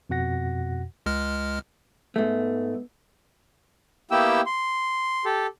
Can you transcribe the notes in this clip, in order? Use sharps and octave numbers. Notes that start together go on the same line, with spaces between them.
F2 B2 F#4 F#5 A#6
C#2 G#3 F6
G#2 A3 B3
A#3 B3 E4 G4 G5 E6
C6
G4 A4